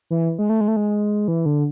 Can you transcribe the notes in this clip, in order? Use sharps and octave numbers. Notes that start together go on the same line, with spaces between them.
E3
G#3
A3
G#3
A3
G#3
E3
D3